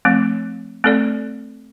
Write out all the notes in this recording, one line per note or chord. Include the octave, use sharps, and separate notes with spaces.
F3 A3 C4
A3 C4 A4 D5